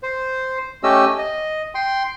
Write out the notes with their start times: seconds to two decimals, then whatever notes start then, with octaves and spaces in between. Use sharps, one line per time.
0.03 C5
0.83 A3 C#4 G4 D#5 E6
1.18 D#5
1.75 G5 C6